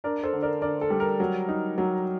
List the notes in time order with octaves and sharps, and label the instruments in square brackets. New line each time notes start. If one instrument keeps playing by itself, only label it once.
[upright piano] D4 A#4 D5
A4 C5
D3
A#4 D5
D3 A#4 D5
A4
G3
A#4
F#3
D#4
F#3